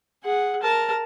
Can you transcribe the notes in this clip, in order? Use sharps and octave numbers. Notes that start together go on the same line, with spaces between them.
G#4 F#5
A#4 A5